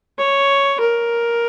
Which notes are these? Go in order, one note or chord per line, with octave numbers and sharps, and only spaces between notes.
C#5
A#4